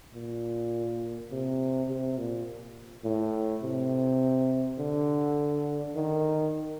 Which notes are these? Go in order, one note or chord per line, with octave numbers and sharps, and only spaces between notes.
A#2
C3
C3
A#2
A2
C3
D3
D#3